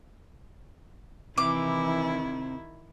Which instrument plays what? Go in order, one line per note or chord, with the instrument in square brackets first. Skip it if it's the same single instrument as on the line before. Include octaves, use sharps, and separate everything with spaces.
[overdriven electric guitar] C3 [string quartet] D#3 E4 [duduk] E3 [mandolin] D6